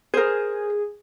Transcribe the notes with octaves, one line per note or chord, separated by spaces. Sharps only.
G#4 A#4 C5